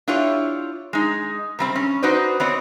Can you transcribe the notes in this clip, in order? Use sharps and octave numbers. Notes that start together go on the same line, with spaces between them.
D4 E4 F4 G4 C#5
G#3 D#4
C3 G3 C4
C#4
D#4 F#4 B4 C5 D5
B3 C4 C#5 D#5